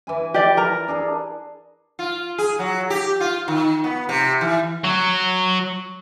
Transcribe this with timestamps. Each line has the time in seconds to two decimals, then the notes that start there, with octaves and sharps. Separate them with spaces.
0.07 E3 E4 G#5
0.34 G4 D5
0.57 A#4 A#5
0.88 D4 G#4 A4
1.99 F4
2.38 G#4
2.59 F#3
2.90 G4
3.20 F4
3.48 D#3
3.84 B3
4.09 C3
4.41 E3
4.84 F#3